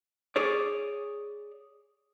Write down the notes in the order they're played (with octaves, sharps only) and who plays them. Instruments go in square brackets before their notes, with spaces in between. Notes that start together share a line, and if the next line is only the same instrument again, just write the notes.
[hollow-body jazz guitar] G#4 C#5 D5